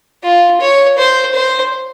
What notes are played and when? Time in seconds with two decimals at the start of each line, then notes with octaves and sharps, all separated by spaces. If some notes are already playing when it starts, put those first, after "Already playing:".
0.24 F4
0.61 C#5
0.98 C5
1.35 C5